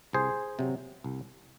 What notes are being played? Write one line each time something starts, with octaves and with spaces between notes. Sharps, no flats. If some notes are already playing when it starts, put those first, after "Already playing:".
C2 G#4 C5
C3 F#3
C2